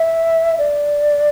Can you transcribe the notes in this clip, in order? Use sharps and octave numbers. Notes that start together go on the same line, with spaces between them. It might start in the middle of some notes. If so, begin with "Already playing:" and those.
Already playing: E5
D5